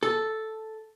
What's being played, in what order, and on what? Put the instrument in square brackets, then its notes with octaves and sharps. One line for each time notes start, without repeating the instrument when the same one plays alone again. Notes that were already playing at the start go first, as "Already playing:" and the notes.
[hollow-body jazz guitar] A4